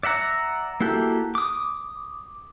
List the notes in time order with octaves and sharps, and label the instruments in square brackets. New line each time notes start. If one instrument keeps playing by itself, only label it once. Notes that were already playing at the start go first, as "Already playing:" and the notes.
[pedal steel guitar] D5 E5 F#5 A#5
A#3 E4 F#4 G4 A4
D6 D#6